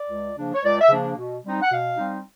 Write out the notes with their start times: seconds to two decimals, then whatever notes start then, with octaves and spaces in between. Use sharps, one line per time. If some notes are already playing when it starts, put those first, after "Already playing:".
Already playing: D5
0.09 C#2
0.35 C#3 F3 A#3 D4
0.53 C#5
0.63 C#2 D5
0.80 E5
0.89 C#3 F3 A#3 D4
1.16 B2
1.44 G3 C4 D#4
1.61 F#5
1.71 B2 F5
1.96 G3 C4 D#4